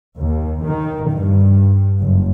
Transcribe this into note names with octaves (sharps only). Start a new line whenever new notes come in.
D#2
D#3
G2
F#1